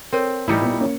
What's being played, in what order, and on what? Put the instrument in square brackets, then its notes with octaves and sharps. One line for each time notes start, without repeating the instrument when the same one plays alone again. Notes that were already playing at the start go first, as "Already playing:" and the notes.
[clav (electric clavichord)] C4 [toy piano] A4 A#4 C#5
[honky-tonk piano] A1 C#7 [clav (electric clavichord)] G3 D#4 E4
[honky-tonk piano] A#2 B3
A#3 C#4